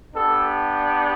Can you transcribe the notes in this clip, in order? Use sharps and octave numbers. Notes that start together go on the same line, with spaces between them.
B3 D4 G4 A4